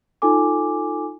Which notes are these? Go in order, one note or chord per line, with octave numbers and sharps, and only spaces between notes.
D#4 F4 A4 G#5 D6